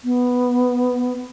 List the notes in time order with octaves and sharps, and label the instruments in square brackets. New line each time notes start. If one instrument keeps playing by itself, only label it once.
[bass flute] B3